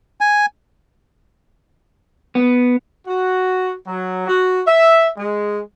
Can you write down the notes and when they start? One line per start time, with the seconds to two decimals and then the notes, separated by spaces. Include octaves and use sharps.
0.21 G#5
2.35 B3
3.06 F#4
3.86 F#3
4.27 F#4
4.66 E5
5.17 G#3